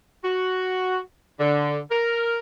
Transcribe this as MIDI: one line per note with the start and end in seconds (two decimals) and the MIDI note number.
0.24 0.98 66
1.40 1.79 50
1.91 2.39 70